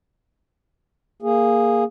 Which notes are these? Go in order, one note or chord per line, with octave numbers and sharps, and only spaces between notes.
A#3 G#4